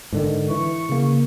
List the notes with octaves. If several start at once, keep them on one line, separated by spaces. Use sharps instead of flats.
G#2 D3 D#3
E3 C#6
C#3 A#3